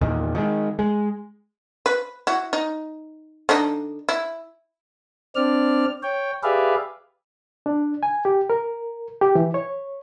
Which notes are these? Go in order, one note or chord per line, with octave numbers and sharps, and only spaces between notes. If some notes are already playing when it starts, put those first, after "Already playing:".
E2 A#2 D#3
D#3 G#3
G#3
B4
E4 F#4
D#4
D3 D4 D#4
E4
C4 D4 D5 F6
C#5 G5
G4 G#4 B4 D5 E5 F5
D4
G#5
G4
A#4
G4
E3
C#5